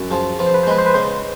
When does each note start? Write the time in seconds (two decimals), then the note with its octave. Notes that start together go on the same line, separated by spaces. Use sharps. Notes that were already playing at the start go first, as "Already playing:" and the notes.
Already playing: F#2
0.10 F3 G#4
0.39 F3 B4
0.46 C5
0.54 B4
0.63 C5
0.67 G#3 B4
0.78 C5
0.86 B4
0.94 C#3 C5
1.02 B4